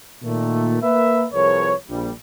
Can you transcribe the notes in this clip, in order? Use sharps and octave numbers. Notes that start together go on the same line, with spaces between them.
A#2 D#3 A3
A#3 A#4 B4 E5
C2 F3 G#4 A#4 B4 C#5
A#1 A#2 G3